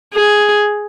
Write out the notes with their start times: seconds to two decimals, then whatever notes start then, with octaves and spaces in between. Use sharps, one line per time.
0.14 G#4